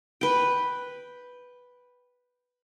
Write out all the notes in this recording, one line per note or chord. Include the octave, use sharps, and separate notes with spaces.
B4 G5